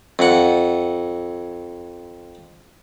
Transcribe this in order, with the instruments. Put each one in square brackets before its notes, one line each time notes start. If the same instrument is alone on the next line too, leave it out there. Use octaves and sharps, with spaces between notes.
[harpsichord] F2 F#5